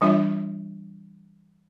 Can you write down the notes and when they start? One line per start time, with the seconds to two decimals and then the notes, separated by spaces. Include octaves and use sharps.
0.01 E3 G3 D4 F4 E5